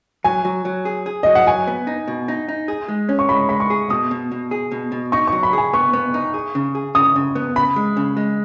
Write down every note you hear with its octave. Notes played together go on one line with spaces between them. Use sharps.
F#3 G#5
F#3
F#3
G#4
G#4
F#3 D#5
F#5
F#3 G#5
B3
D#4
B2
D#4
D#4
G#4
G#3
C#4
C#6
G#3 B5
G#3 B5
C#6
G#4
B2 D#6
B2
B2
G#4
B2
B2
D#4 C#6
F#3 C#6
B5
G#4 G#5
B3 C#6
B3
D#4
G#4
C#3
G#4
C#3 D#6
C#3
B3
C#3 B5
G#3
C#3
G#3